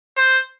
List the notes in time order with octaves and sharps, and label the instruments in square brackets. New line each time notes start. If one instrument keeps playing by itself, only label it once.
[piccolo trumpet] C5